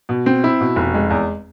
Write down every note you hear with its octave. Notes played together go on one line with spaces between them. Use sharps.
B2
C4
E4
B2
F1
G#3
E2